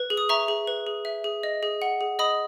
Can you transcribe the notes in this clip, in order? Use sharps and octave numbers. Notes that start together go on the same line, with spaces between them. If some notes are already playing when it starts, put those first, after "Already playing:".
Already playing: B4
G#4
D#6
E5 A#5 C#6
G#4
B4
G#4
E5
G#4
D#5
G#4
F#5
G#4
D#5 B5 D#6